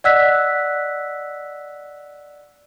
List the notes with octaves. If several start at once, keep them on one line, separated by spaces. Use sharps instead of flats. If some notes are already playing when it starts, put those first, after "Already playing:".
D5 D#5 F#5 E6 F#6 B6